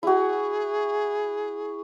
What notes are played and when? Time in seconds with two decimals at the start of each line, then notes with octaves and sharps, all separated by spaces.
0.03 E4 F#4 G#4